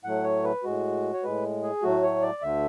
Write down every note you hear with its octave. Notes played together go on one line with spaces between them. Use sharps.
A2 F#3 A3 F#5
C#5
B4
A2 G#3 F#4
C#5
A2 G#3 B4
G#4
A2 F#3 A3 F#4
C#5
D5
D2 D3 A3 E5